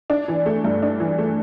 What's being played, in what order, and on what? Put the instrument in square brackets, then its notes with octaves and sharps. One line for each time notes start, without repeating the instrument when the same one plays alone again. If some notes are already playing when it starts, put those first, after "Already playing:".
[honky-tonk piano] D4
E3
A3
G2
D4
E3
A3